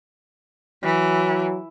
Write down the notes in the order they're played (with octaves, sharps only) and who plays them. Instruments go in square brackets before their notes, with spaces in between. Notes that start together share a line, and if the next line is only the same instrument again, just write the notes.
[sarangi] E3 [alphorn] F#3